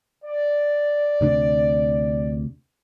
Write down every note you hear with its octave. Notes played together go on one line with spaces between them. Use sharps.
D5
D2 C3 D4